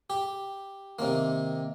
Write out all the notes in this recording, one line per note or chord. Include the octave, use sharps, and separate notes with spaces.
G4
C3 D#3 A#3